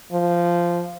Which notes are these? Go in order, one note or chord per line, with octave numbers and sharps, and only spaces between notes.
F3